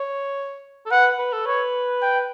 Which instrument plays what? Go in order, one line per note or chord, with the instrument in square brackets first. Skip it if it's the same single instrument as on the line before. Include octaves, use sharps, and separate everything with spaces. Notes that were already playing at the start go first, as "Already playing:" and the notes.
Already playing: [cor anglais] C#5
A4
[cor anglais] B4 [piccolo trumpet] F#5
[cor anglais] B4
A4
[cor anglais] B4 [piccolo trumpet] C#5
[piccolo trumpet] G5